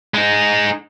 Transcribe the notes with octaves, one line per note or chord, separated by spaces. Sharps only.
G#3 D#4